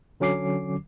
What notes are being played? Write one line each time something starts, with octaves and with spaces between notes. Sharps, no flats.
D3 F#3 C#4 D6 C7